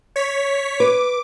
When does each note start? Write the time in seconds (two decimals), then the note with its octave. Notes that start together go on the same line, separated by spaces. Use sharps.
0.16 C#5 B6
0.80 B4 D6